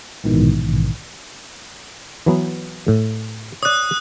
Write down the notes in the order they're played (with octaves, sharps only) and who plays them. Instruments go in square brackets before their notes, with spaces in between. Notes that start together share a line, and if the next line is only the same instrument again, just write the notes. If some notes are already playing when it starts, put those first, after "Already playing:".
[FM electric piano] A#1 G#2 B2 D#3 E3
[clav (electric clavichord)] E3 F#3 B3
A2
[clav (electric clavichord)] C#5 D5 [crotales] D#6 F#6